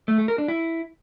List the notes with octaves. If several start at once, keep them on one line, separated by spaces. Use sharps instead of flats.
A3
A3
A#4
D4
E4